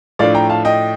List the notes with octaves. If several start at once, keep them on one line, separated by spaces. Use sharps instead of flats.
A2 F3 A3 D4 D5 F5
G5 A#5
F5 A5
D#5 G5